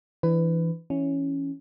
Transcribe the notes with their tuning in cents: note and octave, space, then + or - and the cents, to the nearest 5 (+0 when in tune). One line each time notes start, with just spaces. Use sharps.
E3 +0 D4 +0 B4 +20
E3 +25 C#4 +0 E4 +0